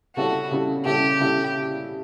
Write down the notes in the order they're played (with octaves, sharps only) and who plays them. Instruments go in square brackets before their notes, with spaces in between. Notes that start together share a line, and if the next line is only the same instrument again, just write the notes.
[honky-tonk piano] C#3 G3 C#4 E4 A4 [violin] F#4
[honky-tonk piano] C#3 G3 C#4 E4 A4
[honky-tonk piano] C#3 G3 C#4 E4 A4 [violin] G4
[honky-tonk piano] C#3 G3 C#4 E4 A4